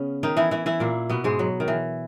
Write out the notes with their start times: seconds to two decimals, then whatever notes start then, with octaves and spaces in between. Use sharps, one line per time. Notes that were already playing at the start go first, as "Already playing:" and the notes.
Already playing: C#3 B3 C#4
0.23 D#3 D#4
0.37 E3 E4
0.51 E3 E4
0.66 E3 E4
0.80 A#2 A#3
1.10 B2 B3
1.24 G#2 G#3
1.39 F#3
1.60 D#3
1.68 E3